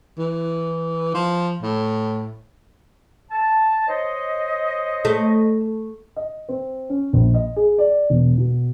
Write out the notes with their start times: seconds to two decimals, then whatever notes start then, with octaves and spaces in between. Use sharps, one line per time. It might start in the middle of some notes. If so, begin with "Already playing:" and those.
0.18 E3
1.14 F3
1.62 A2
3.31 A5
3.88 C5 C#5 D#5
5.05 A3
6.16 D#5
6.49 C4
6.90 C#4
7.13 A#1
7.34 D#5
7.56 G#4
7.78 D5
8.10 E1
8.38 B2